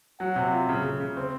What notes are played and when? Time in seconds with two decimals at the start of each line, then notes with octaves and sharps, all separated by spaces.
0.20 F#3 F#5
0.36 C3
0.52 F4
0.69 C#3
0.85 C#3
1.00 C#3
1.17 C4